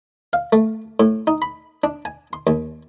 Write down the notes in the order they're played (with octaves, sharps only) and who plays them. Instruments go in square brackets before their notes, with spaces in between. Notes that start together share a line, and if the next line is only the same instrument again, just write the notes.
[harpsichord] F5
A3
A2
D#4
B5
D4
G#5
C6
D#2